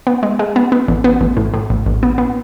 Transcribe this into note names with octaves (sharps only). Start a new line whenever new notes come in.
B3
G#3
G#3
B3
B3
A1
B3
A1
A2
A2
A1
A1
B3
B3